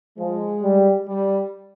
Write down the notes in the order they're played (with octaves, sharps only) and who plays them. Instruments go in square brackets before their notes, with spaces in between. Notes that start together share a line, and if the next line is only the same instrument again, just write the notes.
[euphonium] F3 [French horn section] G#3
[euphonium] G3
[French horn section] G3